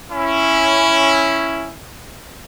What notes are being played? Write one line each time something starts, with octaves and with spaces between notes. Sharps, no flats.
C#4 E4